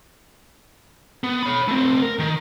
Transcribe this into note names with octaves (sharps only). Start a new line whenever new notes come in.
B3
C#5 B5
A3 C4
A#4
D#3